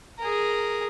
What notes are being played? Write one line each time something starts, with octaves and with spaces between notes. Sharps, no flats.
G#4 A#4